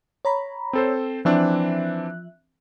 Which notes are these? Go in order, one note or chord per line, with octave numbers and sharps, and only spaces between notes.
C#5 A#5 B5
C4 A4 C5
E3 F3 C4 D4 E5 F#6